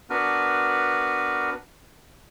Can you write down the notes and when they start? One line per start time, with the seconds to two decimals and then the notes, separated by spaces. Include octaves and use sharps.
0.10 B3 D4 F#4 A#4 B4